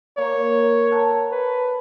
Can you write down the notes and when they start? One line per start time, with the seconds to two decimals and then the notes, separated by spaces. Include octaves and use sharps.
0.18 A#3 C#5
0.91 A4 F#5 A#5
1.32 B4